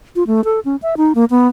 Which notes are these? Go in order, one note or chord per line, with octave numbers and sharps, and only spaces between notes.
F4
A3
A4
C#4
E5
D#4
A#3
B3